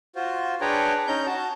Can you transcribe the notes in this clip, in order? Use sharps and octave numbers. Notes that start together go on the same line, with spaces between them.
F4 F#4 C5
D4 G#4 B4 C#5 G5 A#5
C#4 D#4 A#5 G6
F#4 A5